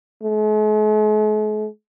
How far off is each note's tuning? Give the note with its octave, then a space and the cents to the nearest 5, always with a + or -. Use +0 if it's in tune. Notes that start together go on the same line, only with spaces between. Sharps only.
G#3 +45